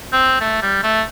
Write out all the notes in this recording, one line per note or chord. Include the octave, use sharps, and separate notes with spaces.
C4
A3
G3
A3